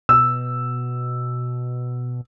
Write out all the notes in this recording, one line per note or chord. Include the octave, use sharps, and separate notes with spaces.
B2 E6